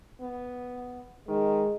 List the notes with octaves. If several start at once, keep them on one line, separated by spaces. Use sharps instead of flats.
B3
D#3 G#3